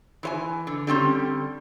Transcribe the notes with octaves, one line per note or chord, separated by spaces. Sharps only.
E3 C#5 G#5
D3
D3 G3 C4 C#4